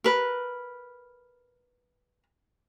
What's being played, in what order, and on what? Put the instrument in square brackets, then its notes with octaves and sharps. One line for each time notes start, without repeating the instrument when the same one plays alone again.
[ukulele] A#4 B4